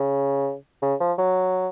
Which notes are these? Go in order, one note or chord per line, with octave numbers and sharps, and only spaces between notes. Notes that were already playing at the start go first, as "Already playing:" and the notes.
Already playing: C#3
C#3
F3
F#3